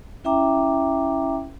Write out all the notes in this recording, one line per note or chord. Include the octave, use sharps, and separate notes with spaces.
C#4 E4 E5 G5 A#5 D6